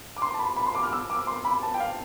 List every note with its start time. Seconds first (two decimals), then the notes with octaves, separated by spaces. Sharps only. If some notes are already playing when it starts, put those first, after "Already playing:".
0.17 D6
0.22 C6
0.34 A5
0.39 B5
0.56 B5
0.66 C6
0.75 D6
0.83 F6
0.93 E6
1.10 D6
1.27 C6
1.45 B5
1.63 A5
1.74 G5
1.80 F5